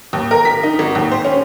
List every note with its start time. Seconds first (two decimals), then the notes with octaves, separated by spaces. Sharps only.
0.13 D#2
0.31 A#4
0.45 B6
0.63 D#4
0.79 G#1
0.95 D#2
1.12 C5
1.25 C#4